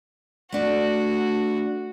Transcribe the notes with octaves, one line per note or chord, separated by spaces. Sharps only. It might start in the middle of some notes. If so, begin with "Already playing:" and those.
A3 D4 F#4